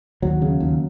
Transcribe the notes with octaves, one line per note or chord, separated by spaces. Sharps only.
D#2 F#3
C#3
D#2